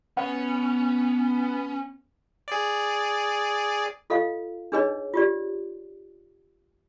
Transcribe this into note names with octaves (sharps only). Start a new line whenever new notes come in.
B3 C#4 F#5
G#4 D5
F4 A4 D#5 F5
D4 D#4 G#4 B4 C#5 D#5
F4 G4 D5